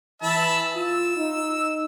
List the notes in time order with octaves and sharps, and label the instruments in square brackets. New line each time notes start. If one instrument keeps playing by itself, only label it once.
[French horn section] E3 [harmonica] E5 A5 B5
[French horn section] F4 [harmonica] E6
[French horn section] D#4